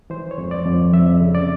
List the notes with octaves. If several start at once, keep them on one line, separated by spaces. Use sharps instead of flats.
E3 C5
C#5
F2
D5
F2
F2 E5
C#3
D5